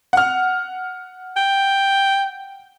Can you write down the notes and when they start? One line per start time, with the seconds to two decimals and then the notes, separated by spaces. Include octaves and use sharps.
0.13 F#5 F6
1.37 G5